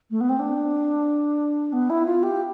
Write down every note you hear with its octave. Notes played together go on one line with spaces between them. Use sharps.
A3
B3
C4
D4
B3
E4
F4
G4